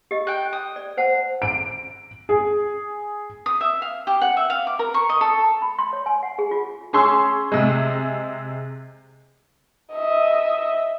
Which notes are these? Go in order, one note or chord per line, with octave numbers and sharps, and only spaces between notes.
G4 D#5
G5 F#6
D#6
D5
C5 F#5 A5
D7
G#4
D#6
E5
F5
G4
F#5
E5
F5
D6
A#4
C#6
D#5
A4
B5
C6
C#5
G#5
F#5
G#4
F4
C#4 G#4 C6 C#6 E6
C3 G#3
D#5 E5